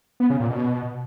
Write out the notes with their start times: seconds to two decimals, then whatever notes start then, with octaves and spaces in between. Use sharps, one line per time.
0.20 B3
0.30 C#3
0.40 A#2
0.50 B2